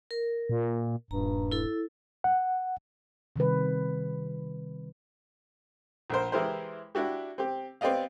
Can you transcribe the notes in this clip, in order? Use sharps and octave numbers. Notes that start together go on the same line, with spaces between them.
A#4
A#2
D#1 G2 A#5
E4 A4
F#5
C3 D#3 G3 B4
A#1 A#4 C5
E3 G#3 E4 G4 A#4 C5
D4 E4 F#4 G4
C4 G4
B3 C4 G4 D5 D#5 F5